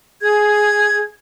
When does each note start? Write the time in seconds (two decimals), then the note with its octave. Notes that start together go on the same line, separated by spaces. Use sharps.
0.22 G#4 G#6